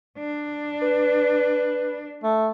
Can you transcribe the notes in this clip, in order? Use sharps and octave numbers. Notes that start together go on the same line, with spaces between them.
D4
B4
A3